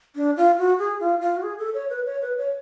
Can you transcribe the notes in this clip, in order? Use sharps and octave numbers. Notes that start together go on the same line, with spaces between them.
D4
F4
F#4
G#4
F4
F4
F#4
G#4
A4
C#5
B4
C#5
B4
C#5